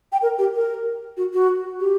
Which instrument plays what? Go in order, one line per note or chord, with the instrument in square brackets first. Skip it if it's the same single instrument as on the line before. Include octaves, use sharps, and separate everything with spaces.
[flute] G5
A#4
G4
A#4
F#4
F#4
G4